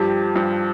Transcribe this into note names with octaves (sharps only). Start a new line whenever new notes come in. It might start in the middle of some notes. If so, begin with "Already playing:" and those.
Already playing: G2 F3 G4
G2 F3